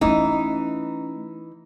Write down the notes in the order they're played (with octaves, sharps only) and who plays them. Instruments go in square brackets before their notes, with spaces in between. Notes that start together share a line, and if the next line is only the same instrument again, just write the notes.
[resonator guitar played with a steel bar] E3 D#4 [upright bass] A3 C#4